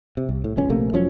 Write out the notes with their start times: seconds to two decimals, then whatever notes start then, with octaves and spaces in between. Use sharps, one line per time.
0.17 C3
0.29 C2
0.44 A2
0.57 D1 C#2 C#4
0.69 A#1 C3 A3 A#3
0.93 F1 F3 F#3 C#4